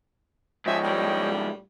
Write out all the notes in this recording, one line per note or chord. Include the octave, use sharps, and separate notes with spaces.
G#2 F3 G#4 C#5 D#5 E5 G5
A2 G3